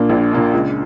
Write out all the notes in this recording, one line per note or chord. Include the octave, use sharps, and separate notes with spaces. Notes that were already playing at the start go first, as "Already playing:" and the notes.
Already playing: A#2 A#3 D4
A#1
A#2 A#3 D4
C#2